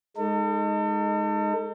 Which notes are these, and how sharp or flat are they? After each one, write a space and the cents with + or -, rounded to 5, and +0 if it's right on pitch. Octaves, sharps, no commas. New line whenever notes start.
G#3 +5 D#4 +0 A4 +40